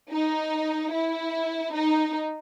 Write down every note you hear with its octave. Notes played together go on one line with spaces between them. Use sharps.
D#4
E4
D#4